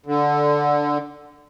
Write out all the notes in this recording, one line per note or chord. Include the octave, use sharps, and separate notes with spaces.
D3